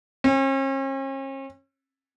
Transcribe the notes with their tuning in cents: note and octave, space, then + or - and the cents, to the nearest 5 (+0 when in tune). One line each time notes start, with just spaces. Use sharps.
C#4 -45